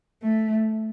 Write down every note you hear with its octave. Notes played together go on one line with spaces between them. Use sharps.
A3